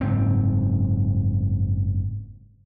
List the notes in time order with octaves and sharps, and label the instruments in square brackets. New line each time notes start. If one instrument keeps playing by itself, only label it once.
[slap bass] F#1 G#2 C4